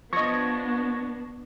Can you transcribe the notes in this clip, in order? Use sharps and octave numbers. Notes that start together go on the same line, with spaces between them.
F3 B3 D4 D#5 C#6 G#6 A#6